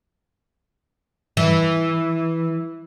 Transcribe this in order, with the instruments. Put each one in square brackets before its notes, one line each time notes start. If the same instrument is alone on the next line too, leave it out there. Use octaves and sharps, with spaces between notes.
[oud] E3